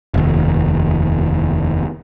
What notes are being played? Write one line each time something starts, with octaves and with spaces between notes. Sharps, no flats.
F1 D#2